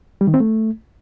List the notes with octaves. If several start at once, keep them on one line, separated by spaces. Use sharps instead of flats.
G3
D#3
C4
A3